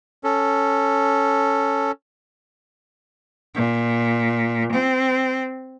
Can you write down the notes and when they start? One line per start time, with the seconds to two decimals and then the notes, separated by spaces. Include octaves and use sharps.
0.24 C#4 A4
3.55 A#2
4.72 C4